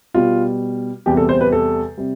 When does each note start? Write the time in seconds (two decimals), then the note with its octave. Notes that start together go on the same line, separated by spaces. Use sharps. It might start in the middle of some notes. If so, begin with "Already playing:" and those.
0.14 B2 G3 F4
1.06 E2 C3 G3 G4
1.17 A4
1.29 C5
1.41 B4
1.52 A4
1.98 C3 G3